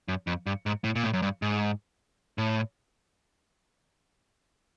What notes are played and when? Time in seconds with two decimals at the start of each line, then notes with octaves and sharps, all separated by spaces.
0.08 F#2
0.27 F2
0.46 G2
0.66 G#2
0.84 A2
0.96 A#2
1.04 A2
1.13 F#2
1.22 G2
1.42 G#2
2.38 A2